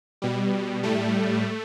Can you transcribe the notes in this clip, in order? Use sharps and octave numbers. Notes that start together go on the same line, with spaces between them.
B2 G3
A2 G3 A3